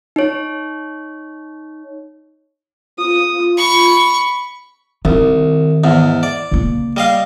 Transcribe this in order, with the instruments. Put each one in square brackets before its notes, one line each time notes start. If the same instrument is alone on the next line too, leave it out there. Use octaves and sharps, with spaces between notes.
[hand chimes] D#4 C#5
[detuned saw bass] F4 [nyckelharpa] D#6
[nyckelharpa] B5 [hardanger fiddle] C#6
[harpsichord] C2 [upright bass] D#3
[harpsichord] E2 G#2
D5
[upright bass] C#3 A#3
[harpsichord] G3 D#5 F5